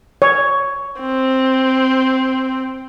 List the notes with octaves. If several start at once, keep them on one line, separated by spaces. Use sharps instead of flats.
C#5
C4